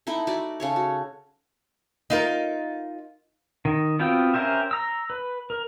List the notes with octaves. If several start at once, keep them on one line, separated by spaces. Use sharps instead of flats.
A3 D#4 E4 B5
D#4 F#4 D5
C#3 A4 C#5
F#4
D#4 F4 A#4
D#3
B3 C4 F4 F#4 G5
C#4 G4 A#4 C5 E5
A#5 E6
B4
A#4